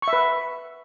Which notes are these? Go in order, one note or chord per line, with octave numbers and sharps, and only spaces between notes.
C#6
E5
B4